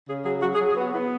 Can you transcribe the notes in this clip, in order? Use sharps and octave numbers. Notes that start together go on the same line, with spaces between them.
C#3 G#4
F#3 G#4
F#3 F#4
G#4
F#3
G#4
B3 F#4
B3 E4